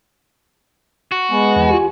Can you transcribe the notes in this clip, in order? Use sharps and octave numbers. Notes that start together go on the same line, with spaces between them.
F#4
G#3 B3 G#5
E2 E3
F4 G4